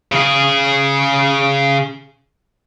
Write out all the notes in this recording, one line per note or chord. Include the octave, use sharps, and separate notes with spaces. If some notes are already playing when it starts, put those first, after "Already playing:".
C#3 G#4